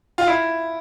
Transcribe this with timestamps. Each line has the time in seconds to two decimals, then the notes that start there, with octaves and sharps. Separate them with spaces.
0.18 F4
0.27 E4